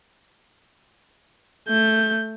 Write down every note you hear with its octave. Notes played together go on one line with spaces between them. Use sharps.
A3 G6